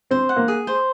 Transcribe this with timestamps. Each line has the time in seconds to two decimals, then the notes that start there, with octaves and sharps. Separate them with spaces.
0.11 C4 C5
0.29 F#5
0.36 A#3
0.48 G#4
0.67 C5